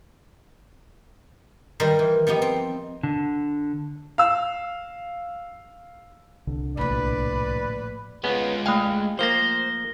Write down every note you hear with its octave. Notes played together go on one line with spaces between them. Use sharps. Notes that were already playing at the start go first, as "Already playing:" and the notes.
D#3 G3 A#4 C5
E3
F3 B3 D#4 G4
C4
D3
F5 E6
C2 D3
A#1 A2 B4 D5
G#3 B3 C#4 F4
A3 F5 G5 G#5
F3 A#3 C5 A#6 G7